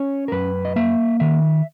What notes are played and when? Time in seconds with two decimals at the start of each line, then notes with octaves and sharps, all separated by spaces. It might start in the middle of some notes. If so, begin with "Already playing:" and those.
Already playing: C#4 C#5
0.28 A#4
0.32 F#2 B4
0.65 D#5
0.76 A#3 E5
1.20 D#3 E5